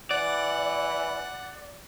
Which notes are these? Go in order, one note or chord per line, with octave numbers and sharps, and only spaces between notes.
E3 D5 F#5